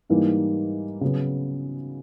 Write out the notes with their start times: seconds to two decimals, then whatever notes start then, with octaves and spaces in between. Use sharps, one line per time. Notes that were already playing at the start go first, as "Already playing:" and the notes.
0.09 G#2 E3 G3 A#3 D#4
1.01 C#3 F#3 B3